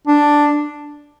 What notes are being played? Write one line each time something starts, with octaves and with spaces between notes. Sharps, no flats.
D4